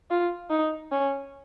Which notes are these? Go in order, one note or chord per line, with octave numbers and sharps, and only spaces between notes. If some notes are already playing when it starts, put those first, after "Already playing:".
F4
D#4
C#4